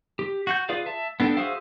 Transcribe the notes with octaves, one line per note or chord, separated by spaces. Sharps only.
G4
F#4 F#5 G6
F4 G#4 B4 D5 F5
E5 A5
B3 D4 A4 G5
F#4 G#4 C5 E5 F5